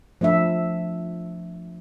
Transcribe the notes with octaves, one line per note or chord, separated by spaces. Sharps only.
F3 A3 D4 E5